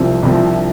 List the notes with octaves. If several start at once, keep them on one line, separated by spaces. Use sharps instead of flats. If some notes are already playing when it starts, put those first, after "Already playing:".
Already playing: C2 C3 F3 C4
C2 C3 F3 C4